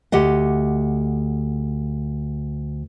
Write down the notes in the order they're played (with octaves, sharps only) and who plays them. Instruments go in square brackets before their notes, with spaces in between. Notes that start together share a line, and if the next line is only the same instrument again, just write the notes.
[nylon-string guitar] D2 G4 D#5 F#5